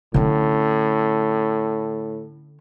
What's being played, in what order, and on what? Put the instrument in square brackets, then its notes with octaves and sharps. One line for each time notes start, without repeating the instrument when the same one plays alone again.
[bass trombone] A2 [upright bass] D3 C#4